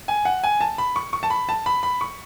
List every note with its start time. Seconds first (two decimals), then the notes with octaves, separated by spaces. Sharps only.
0.08 G#5
0.25 F#5
0.44 G#5
0.61 A5
0.78 B5
0.96 C#6
1.13 C#6
1.23 A5
1.30 B5
1.49 A5
1.66 B5
1.83 B5
2.01 C#6